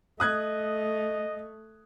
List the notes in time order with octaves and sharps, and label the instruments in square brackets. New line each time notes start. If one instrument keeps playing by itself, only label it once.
[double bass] A3 [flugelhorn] D#5 [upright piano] D#6 F#6 G#6